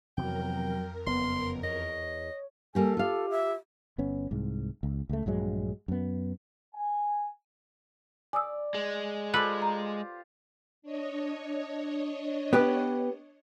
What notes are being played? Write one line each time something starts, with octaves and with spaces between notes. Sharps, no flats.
F2 C3 E3 F#3 B3 A#4 G5
F#1 B3 C6
E2 C#5 D#5
G3 A#3 G4 A4 G#5
F4 G4 F5
E5
G1 B3 C#4
C2 G#2
C#2
C#2 A3
A#1 G2 F#3 G#3
F#2 B3
G#5
D5 G#5 D#6 E6
G#3
F4 G4 A4 B4 C5
A#5
D4 C#5 D#5
B3 G4 B4